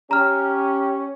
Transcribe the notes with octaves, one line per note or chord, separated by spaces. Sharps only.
C#4 G4 A#5 F6